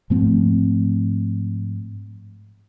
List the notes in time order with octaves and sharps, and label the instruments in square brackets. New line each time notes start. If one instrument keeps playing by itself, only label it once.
[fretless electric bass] G#2 F3 A3 C4